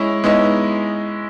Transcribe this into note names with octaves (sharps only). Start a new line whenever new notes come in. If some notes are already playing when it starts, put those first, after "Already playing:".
Already playing: G#3 C#4 E4
G#3 B3 C#4 D#4 E4